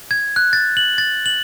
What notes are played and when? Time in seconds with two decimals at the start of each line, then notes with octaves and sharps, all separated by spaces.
0.11 G#6
0.36 F#6
0.53 A6
0.77 F#7
0.98 A6
1.26 F#7